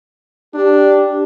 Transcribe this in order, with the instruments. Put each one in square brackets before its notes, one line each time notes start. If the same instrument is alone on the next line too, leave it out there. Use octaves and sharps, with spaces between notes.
[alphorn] D4 [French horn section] G4